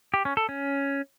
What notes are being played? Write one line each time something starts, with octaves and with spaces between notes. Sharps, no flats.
G4
C#4
A4
C#4